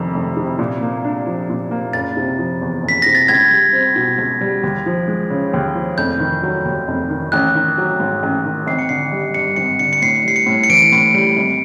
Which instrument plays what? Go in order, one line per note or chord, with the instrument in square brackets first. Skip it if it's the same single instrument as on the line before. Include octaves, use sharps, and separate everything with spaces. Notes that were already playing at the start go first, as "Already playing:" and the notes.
Already playing: [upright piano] F1 F2 C3 D#3
F1
C3
A#2
A#3
D4
F3
A#2
A#3
[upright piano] F#1 [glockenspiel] A6
[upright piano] C3
F3
E2
F#1
[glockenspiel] B6
[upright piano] C3 [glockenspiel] A#6
[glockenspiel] A6
[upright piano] C#2 [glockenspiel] G#6
[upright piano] G3
C4
B2
C#2
G3
D#2
F3
G#3
C#3
D#2
F3
[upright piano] F1 [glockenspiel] G6
[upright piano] D#3
F#3
D#2
F1
D#3
[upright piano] A1 [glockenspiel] F#6
[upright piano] D#3
F#3
G#2
A1
D#3
[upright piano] G#1 [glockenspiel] C7
[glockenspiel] C#7
[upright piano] D3 [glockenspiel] C7
[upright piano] G3
[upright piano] G2 [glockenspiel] C#7
[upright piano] G#1 [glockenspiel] C#7
[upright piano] D3 [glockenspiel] C#7
[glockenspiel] C#7
[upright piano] A2 [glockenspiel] C7
[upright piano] G3 [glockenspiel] C7
[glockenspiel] C#7
[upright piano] A2
[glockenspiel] C#7
[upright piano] E3 [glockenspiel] D7
[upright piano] A2
G3
G#1